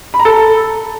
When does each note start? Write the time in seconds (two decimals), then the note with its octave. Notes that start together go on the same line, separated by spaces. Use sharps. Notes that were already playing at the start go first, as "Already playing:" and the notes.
0.14 B5
0.19 A#5
0.25 A4